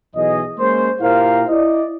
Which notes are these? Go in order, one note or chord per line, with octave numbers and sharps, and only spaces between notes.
B1 E3 G#4 D#5
G#3 A#3 C#4 C5
A#2 E4 G4 A#4 C5 F5
E4 D5 D#5